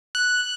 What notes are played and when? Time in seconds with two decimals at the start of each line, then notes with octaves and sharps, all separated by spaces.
0.15 F#6